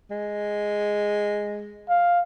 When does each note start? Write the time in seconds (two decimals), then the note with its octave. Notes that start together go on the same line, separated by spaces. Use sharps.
0.11 G#3
1.89 F5